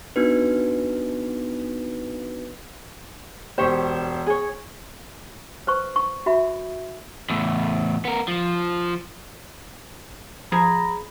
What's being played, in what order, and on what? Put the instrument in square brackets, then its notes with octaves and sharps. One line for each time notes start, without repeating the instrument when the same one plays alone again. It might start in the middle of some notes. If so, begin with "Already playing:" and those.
[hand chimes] B3 D4 D#4 F#4 B4
[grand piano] E1 C5 [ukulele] G4 C#5
[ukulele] G#4 C#5
[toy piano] B4 C5 C#6
C#6
F#4 E5 B5
[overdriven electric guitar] E2 A2
B3 A#4
F3
[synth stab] F3 [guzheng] G#4 [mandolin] A#5 [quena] B5